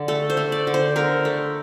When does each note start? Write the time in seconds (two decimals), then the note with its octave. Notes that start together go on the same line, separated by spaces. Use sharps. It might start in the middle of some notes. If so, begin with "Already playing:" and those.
Already playing: D3 D5
0.08 A3 A4
0.30 C5
0.37 A3
0.52 D5
0.67 D3
0.74 C5
0.96 D3 A#4
1.25 A3